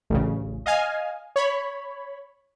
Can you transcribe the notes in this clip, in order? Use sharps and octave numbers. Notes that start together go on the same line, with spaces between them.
A1 D2 C#3
D#5 F5 G#5
C#5 B5